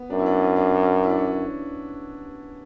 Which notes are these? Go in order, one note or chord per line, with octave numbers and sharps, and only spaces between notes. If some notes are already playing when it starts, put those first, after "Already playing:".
Already playing: B3
F#2 D4
E4
D4
D4
E4
D4
C#4
D4